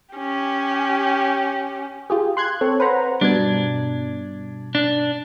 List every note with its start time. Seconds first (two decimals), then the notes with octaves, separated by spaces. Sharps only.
0.15 C#4 G4
2.10 F4 G4 G#4
2.37 C6 F#6 G#6
2.61 C4 A4 C#5
2.80 B4 C5 F#5 A#5
3.21 G2 B2 D4 G#6
4.75 D4